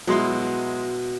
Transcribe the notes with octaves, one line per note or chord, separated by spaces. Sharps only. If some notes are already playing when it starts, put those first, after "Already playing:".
B2 F#3 G#3 E4 C6